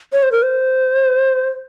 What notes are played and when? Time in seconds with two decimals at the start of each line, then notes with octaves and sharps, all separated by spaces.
0.13 C#5
0.23 C5
0.32 A#4
0.43 C5